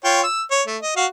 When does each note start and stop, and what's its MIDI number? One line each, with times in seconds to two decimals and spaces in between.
0.04 0.22 65
0.04 0.22 73
0.04 0.22 79
0.23 0.42 88
0.51 0.63 73
0.66 0.78 57
0.82 0.94 75
0.96 1.06 66
0.96 1.06 77